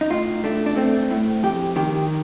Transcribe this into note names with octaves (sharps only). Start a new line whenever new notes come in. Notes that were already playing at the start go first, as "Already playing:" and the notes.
D#4
A2 F4
A3 D4
D4
A3 C4
A2
F2 G4
D#3 G4